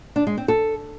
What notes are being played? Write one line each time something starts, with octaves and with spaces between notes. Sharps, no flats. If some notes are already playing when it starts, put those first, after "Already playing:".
D4
G#3
C4
A4